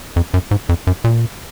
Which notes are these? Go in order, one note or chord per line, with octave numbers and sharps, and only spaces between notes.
F2
F#2
G#2
F2
F#2
A#2